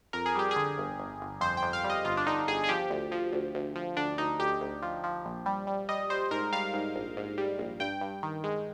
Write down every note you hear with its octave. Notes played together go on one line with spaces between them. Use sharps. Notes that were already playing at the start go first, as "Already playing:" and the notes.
F2 A#4
G#4
G3 G4
G#4
D3
G1
G1
G1
F2 C5
G5
F2
F5
G3
D#5
G1 F4
D4
D3 D#4
G1 G#4
G#4
F3 G4
D2
F3
D2
D2
F3
D2 D4
D2 D#4
D2 G4
D2
F3
F3
A#1
G3
G3
G3 D#5
G3 C5
G#2 A#4
G3 F5
G#2
A#1
G#2
G3
A#1
G2 G5
G2
D#3
G#3